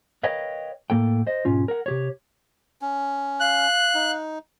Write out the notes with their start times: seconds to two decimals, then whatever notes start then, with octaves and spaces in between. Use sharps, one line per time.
0.23 A#4 B4 C#5 D#5 F5 G5
0.90 A2 A#3 A4 G5
1.27 C5 D#5
1.45 B1 G#2 C#4 F4
1.68 A#4 F#5
1.86 C3 G4 C#5
2.81 C#4
3.40 F5 F#6
3.95 D#4